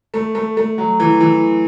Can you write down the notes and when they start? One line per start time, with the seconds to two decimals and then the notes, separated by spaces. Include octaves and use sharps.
0.14 A3
0.35 A3
0.57 A3
0.78 F#3
1.00 E3
1.21 E3